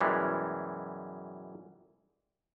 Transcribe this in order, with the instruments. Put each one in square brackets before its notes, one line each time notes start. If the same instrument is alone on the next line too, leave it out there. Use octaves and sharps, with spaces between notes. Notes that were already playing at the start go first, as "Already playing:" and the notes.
[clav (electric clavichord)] F#2 B2 E3 G3 G#3